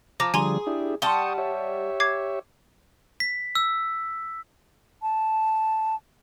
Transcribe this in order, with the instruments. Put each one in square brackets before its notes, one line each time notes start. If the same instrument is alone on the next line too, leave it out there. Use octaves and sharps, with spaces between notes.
[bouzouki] F3 [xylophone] A#5 D6 A#6
[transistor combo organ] D3 F3 G3 [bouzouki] G#4 [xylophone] G#5 A#5 C6
[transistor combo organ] D4 E4 G4
[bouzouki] G3 F#5 A5 [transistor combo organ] G5 C#6 D#6 [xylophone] C6 G7
[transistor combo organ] G4 C#5 E5
[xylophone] D6 G#6 C7
[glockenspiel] B6
E6
[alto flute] A5